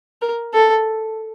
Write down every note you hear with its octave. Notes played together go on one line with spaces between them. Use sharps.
A#4
A4